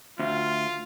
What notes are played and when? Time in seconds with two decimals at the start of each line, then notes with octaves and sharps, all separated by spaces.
0.19 D2 F4